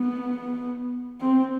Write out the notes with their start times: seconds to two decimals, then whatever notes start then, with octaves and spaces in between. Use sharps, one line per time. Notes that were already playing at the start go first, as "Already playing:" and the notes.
Already playing: B3
1.21 C4